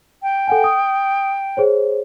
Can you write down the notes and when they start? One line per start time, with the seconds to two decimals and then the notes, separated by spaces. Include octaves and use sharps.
0.22 G5
0.48 A4 F#5 G#5
0.64 D#6
1.57 G#4 C5 C#5